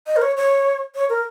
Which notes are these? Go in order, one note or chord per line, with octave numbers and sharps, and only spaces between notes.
D#5
A#4
C#5
C#5
C#5
A#4